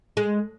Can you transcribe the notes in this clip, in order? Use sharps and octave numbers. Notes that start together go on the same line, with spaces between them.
G#3